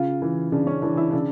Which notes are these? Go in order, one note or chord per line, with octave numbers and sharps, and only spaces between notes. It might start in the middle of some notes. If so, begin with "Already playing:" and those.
Already playing: C#3 F4
E3
C#3 D4
C#4
E3 D4
E4
C#3 D4